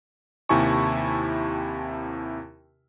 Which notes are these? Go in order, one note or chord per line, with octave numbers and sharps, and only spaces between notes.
D#2 C3 E4 G#5 A5 C#6